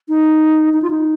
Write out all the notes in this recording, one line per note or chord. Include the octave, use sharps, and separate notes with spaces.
D#4
D#4
F4
D#4